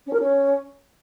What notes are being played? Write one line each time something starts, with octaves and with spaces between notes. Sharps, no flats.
C#4
A#4
C#4